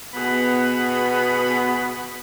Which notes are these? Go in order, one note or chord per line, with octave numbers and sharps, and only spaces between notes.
B2 B3 G#4 B5